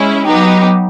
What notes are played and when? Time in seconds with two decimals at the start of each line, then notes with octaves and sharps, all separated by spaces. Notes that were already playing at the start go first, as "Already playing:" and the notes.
Already playing: G#3 C#4 E4
0.25 F#3 B3 D#4 G4